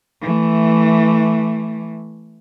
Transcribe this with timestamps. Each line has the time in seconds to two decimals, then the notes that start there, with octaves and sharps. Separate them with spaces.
0.22 E3 A3